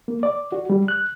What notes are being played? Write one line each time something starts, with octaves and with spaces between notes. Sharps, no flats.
A#3
D5
F#4
G3
F#6